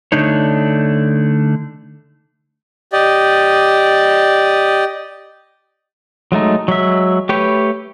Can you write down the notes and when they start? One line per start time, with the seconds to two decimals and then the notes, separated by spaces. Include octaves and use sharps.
0.12 D3 A3 D4 D#4 C#5
2.93 G4 D5 D#5
6.32 F#3 G#3 A3 D#4
6.68 F#3 G#3 E5
7.29 A3 G4 B4 C#5 G5